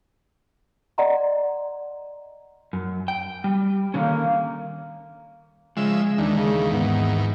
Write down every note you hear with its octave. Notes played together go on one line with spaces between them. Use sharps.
D5 D#5 F#5 A#5 C6
F#2
G5
G3
D3 D#3 A#3 C#4
C#3 F3 G#3 E5
D#2 D#3 E3 D4
C#3
G#2 B3